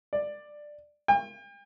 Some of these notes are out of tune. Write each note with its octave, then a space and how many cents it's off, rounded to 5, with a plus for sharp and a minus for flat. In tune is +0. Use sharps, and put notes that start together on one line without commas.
D5 +10
G5 +40